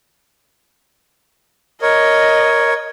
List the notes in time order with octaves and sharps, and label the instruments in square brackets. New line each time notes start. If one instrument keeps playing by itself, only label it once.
[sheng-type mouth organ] A#4 C#5 [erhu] D#5